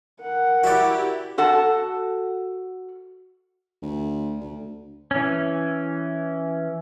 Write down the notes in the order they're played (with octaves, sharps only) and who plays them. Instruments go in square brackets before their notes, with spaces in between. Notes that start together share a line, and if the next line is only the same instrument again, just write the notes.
[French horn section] A#4 [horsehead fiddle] F#5
[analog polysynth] E4 G4 [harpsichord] F#4 D5
[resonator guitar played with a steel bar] F#4 A4 F#5 A5
[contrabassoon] D2
D2
[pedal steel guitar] E3 C#4